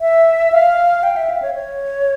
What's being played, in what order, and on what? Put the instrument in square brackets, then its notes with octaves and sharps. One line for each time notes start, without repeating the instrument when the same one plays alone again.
[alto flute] E5
F5
G5
E5
F5
C#5
C#5